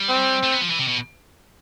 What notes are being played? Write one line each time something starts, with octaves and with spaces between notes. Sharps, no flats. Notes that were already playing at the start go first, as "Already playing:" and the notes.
Already playing: G3
C4
A3
B3
F3
E3
C3
B2